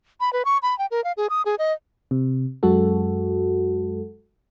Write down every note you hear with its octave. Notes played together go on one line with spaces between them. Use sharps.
B5
B4
C#6
B5
G5
A#4
F5
G#4
D#6
G#4
D#5
C3
F#2 G#3 F#4 A4